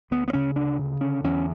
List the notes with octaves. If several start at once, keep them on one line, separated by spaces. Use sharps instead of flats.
D2 B3
B3
C#3 C#4
D2 D4
C#3
D3 C#4
E2 C#4